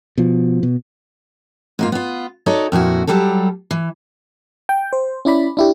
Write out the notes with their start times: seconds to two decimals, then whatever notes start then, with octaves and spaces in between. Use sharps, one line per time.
0.18 B2 F3
0.63 B2
1.79 G#2 A#3 F4
1.92 B3 F4
2.46 D#4 F#4 A4 C#5 D5
2.72 F2 A#2 E4 F#4
3.07 F#3 G3 G4 A4
3.71 E3
4.69 G5
4.93 C5
5.25 C#4 E4 D5 B5
5.57 D4 E4 G4